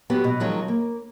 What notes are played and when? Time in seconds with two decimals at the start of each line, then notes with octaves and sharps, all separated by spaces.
0.10 F#3 B3 G4
0.24 B2
0.40 D#3 F3 F#3 G#3
0.68 A#3